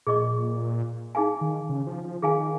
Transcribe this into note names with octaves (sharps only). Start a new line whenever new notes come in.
A#2 G#4 D#5 C#6
D#4 G#4 F5 G#5
D#3
C#3
F3
F3
D#3 G#4 F5 G#5